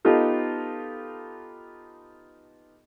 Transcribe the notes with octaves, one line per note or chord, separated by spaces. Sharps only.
B3 D#4 F4 G4 A4